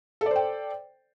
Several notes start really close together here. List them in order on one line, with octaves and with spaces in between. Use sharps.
A4 D5 C5 G5